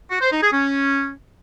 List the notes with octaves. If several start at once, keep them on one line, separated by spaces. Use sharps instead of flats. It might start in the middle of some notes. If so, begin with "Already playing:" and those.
F#4
C5
D#4
G#4
C#4